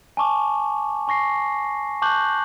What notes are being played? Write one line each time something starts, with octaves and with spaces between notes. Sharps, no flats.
G#5 A5 C#6 D6
G#5 C#6 A#6 C7
A5 C#6 D6 F#6 G6 F#7